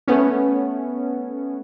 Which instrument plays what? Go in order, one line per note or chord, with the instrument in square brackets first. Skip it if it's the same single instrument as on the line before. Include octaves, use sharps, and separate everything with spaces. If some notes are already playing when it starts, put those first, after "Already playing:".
[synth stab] A3 B3 C#4